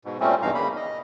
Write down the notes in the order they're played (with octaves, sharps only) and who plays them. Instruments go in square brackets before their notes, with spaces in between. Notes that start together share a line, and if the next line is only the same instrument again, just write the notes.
[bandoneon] G#2 B2
A#2 G3 A3 C4 C#4
E2 G2 B2 D#4 F5 A#5
C#3 A#3 B5
D#5